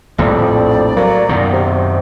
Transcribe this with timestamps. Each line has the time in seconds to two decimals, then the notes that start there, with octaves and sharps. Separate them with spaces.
0.18 A#1 F2 A2 G3 D5
0.97 F#3 A#3
1.29 F#2 B2 D#3
1.53 C3